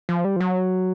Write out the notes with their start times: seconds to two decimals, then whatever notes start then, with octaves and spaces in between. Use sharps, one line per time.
0.09 F3
0.24 G3
0.36 F3
0.40 F#3